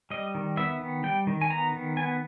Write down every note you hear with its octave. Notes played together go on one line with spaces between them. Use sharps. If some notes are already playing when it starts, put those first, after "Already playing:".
G3 D#5
D#3
B3 E5
D#3
G3 G5
D#3
G#5
B3 A#5
D#3
B3 G#5